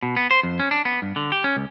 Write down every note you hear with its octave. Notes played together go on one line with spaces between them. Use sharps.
B2
B3
C5
F2
C#4
D4
B3
G2
D3
G4
C#4
C#2